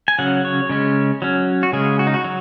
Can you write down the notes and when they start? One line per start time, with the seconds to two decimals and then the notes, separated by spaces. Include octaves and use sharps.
0.08 G#5
0.19 C#3 F#3 C#4 F#5
0.45 C#5
0.69 C#3 G#3 C#4
1.22 F#3 C#4
1.63 F#4
1.73 C#3 G#3 C#4 G#4
1.99 F#4
2.07 D#4
2.14 F#4
2.24 F#3